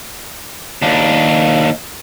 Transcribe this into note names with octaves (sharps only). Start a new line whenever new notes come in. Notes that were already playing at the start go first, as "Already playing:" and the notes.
D#2 D4